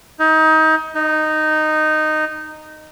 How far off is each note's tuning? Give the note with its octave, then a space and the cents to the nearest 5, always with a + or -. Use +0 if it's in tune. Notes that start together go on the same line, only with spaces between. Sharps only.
D#4 +25
D#4 -10